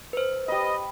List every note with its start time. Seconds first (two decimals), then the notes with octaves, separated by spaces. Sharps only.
0.13 B4 C5
0.48 G4 D#5 B5